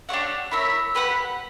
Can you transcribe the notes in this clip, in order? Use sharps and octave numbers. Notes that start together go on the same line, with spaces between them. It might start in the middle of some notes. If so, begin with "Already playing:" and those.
D4 G4 C#5 F#5
E4 A#4 C#5 E5
G4 B4 F#5